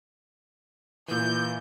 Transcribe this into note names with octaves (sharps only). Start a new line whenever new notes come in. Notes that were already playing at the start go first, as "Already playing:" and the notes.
A#2 E3 G6